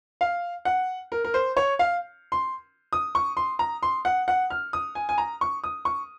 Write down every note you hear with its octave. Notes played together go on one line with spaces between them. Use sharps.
F5
F#5
A#4
A#4
C5
C#5
F5
C6
D#6
C#6
C6
A#5
C6
F#5
F#5
F6
D#6
G#5
G#5
A#5
C#6
D#6
C#6